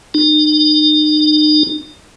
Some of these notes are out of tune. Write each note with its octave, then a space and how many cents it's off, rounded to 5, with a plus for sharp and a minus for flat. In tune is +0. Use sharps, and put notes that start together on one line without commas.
D#4 -40